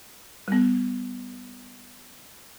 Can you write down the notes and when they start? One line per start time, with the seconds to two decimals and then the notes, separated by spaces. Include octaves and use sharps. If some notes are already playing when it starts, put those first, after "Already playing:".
0.48 G3 B3